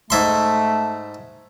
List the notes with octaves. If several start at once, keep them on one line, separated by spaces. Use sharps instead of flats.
G#2 A3 E5 C6